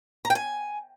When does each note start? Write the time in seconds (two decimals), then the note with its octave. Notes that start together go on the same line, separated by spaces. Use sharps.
0.25 A#5
0.30 G5
0.35 G#5